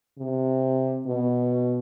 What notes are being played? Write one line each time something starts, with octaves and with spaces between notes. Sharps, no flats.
C3
B2